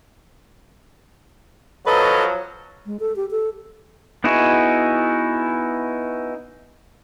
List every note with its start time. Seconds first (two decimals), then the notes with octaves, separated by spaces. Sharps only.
1.87 F3 F#3 A4 B4 D#5
2.86 G#3
3.00 A4
3.16 G4
3.31 A4
4.24 B3 D#4 E4 F#4 G#4